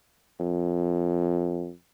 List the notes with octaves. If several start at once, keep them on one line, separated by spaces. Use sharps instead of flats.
F2